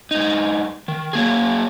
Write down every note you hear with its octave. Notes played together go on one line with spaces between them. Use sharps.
G2 D#4
D#3
F#3 A#3 G#4